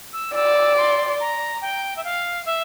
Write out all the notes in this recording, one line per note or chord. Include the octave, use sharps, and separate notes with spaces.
E6
D5 E6
C6
A#5
G5
E5
F5
E5